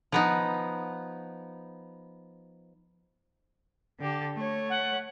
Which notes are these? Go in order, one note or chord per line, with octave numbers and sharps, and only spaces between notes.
F3 B3 D#4
D3 G4 A4
A3 C#5
F#5